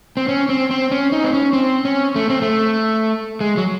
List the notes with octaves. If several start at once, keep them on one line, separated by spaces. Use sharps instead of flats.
C4
C#4
C4
C4
C#4
D#4
C4
C#4
C4
C#4
A3
C4
A3
G#3
F#3